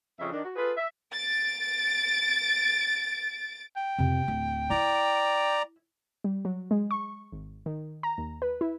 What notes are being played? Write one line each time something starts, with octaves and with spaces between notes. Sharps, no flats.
F2 C#3 F3 D#5 E5
D#3 D4
F#4
F4 G#4 A4 B4
E5
A6 D7
G5
F2 C3
D1
E4 D5 A#5
G3
F#3
G#3
C#6
G#1
D#3
A#5
D#2
B4
E4